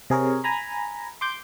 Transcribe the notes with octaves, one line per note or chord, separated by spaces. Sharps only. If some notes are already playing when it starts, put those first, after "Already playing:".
C3 G#4 A#4 C#5
G#5 A#5 B5
C6 D6 G6